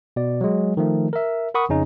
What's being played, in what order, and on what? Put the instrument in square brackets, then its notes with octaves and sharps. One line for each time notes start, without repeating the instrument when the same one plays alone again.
[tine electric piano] B2 D5
F#3 G#3
D#3 F3 A3
A#4 E5
A#4 F#5 B5 C#6 D#6
F2 C#3 C#4 D#4